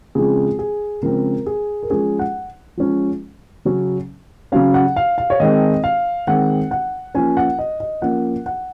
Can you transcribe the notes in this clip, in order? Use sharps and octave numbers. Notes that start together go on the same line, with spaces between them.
C#3 F3 G#3 C4 G#4
G#4
C#3 F3 G#3 C4 A#4
G#4
A#4
F3 G#3 C#4 G#4
F#5
F3 G#3 C#4
C#3 F#3 C#4
C#3 F#3 C#4 F5
F#5
F5
F5
C#5
D#3 G#3 C4 D#5
F5
D#3 G#3 C4 F#5
F#5
F3 A#3 C#4 G#5
F#5
D#5
D#5
F3 A#3 C#4 F#5
F#5